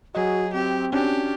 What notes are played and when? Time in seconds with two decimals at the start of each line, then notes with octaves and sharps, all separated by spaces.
0.15 F#3 F#4 G#4 D#5
0.53 C4 G4
0.93 C#4 D4 F#4 G4